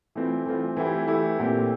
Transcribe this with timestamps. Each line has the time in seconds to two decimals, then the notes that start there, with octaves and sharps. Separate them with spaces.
0.15 E3 A3 C4 F4
0.46 E3 A3 C4 F4
0.77 E3 A3 E4 G4
1.07 E3 A3 E4 G4
1.38 A#2 A3 C4 E4 G4